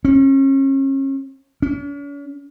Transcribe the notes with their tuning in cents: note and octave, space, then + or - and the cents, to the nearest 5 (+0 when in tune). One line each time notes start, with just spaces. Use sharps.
C#4 -35
C#4 +45